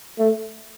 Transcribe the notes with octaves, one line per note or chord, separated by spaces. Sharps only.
A3